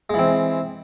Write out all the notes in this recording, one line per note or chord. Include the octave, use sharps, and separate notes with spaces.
E3 G#3 C4